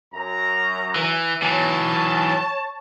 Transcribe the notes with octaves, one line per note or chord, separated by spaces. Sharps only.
F#2 A#5
E3
E3 F#3 C#5 A5